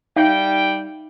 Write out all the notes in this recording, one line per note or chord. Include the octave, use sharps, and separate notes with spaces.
G3 D#4 E5 F5 G5